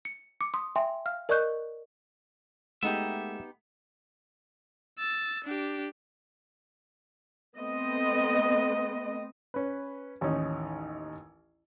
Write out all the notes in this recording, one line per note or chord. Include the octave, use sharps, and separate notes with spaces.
C#7
D6 C#7
C6 D#6
E5 G5 G#5 C6
F5 F6
A#4 D5 D#5 C#6 F#6 G6
G#3 A3 B3 D#4 G4 E5 F#5
E6 A6
D4 G4
A3 B3 C4 D#5
C#4 B4
A1 D#2 C#4 D#4